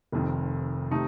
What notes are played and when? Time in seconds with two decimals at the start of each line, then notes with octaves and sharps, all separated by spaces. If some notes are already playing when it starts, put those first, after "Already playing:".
0.12 F1 F2 D#3
0.91 C3 D#3 A3 D#4